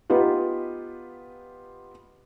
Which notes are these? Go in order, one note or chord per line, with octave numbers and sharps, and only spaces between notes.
B3 D#4 F4 G4 B4